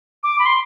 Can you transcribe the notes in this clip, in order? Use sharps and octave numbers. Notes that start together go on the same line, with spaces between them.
D6
B5
C6